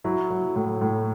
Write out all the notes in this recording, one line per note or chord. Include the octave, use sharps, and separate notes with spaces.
F#3 E4
F#3
A2
A2